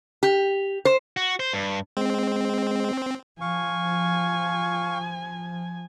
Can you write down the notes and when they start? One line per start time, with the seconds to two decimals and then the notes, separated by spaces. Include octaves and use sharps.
0.23 G4
0.85 C5
1.17 F#4
1.40 C5
1.53 G2
1.97 G#3 C4
3.41 F3 F5 G#5 C#6